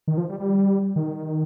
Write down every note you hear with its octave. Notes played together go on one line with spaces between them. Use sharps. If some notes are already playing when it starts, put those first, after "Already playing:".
D#3
F3
G3
G3
D#3